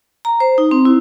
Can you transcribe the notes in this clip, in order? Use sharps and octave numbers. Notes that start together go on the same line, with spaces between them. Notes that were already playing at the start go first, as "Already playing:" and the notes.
A#5
C5
D#4
C4
E4